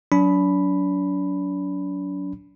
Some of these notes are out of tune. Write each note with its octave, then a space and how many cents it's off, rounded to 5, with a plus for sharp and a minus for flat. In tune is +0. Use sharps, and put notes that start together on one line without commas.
F#3 +0 D4 -40 B5 +0